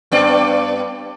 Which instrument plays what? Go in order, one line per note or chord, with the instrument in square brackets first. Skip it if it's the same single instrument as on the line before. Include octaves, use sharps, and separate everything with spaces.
[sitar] G2 B3 D5